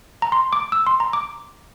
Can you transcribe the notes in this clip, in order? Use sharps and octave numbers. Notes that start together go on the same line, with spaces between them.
A#5
C6
D6
E6
C6
A#5
D6